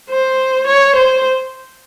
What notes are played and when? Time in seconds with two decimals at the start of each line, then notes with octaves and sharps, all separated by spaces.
0.09 C5
0.67 C#5
0.95 C5